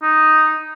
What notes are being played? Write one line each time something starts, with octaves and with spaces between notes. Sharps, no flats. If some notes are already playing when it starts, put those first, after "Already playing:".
D#4